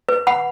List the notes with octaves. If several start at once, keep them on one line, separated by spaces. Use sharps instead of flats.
B4
F#5 B5